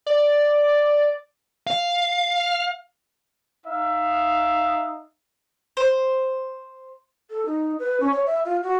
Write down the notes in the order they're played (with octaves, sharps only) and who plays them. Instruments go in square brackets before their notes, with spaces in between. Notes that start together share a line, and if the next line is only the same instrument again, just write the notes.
[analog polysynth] D5
[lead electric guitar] F5
[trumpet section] D#4 E5 F5
[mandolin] C5
[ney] A4
D#4
B4
C#4
C#5
E5
F4
F#4